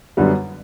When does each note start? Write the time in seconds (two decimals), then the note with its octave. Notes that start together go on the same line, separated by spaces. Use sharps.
0.17 F#2 D3 G3 B3